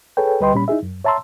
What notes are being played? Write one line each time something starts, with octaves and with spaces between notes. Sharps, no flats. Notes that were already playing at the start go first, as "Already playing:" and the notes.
G#4 A4 B4 C#5 G5
D2 G3 B4 D#5 G5 C6
A#2 G3 C#4 B5
D#4 E4 G#4 E5
F#2
C#5 E5 A5 A#5 C6 E6